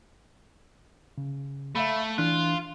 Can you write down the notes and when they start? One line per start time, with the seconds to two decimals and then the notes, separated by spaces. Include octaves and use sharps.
1.18 C#3
1.75 A3 E5 F5 B5
2.18 E3 D4 F4 F#6